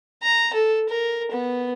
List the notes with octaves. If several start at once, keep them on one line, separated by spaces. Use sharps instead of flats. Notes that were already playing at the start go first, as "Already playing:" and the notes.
A#5
A4
A#4
B3